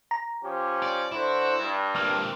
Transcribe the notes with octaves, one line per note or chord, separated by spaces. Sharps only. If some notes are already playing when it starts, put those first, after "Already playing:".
A#5
F3 C#4 G4
D5
D3 E4 F#4 C5
G2
A#3 C4 F6